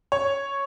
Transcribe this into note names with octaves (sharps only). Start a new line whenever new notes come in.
C#5